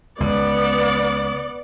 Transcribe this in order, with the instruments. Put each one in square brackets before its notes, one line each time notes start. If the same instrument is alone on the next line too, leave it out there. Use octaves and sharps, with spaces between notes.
[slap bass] C#2 [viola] B3 D5